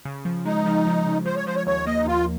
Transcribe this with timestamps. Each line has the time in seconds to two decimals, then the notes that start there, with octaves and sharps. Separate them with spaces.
0.05 C#3
0.25 F3
0.45 G#3 D#4
0.66 F3
0.87 F3
1.06 C#3
1.26 F3 C5
1.36 C#5
1.46 F3 C5
1.56 C#5
1.67 D#2 C#5
1.86 A#3 D#5
2.00 D#4
2.06 D#2 F4